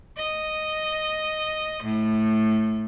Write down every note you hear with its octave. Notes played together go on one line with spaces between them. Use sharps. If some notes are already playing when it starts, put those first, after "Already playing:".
D#5
A2